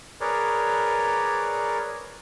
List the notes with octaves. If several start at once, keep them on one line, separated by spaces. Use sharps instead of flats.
G#4 A#4 B4 C#5 D5